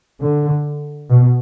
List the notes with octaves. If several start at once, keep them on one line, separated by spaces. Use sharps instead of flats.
D3
B2